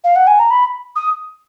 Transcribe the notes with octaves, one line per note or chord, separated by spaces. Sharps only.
F5
F#5
G#5
A#5
B5
D#6